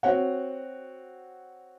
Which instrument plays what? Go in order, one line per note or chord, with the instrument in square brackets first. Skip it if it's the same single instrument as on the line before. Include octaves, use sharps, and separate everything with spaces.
[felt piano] C4 F#4 C#5 F#5